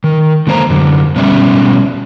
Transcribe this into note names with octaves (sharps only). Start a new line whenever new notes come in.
D#3
D3 G#3 A#3 C5 A#5
F#2 D3
B2 G3 C#4 E5